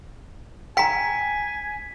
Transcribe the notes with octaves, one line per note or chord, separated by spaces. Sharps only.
G5 G#5 A#5 B6 C#7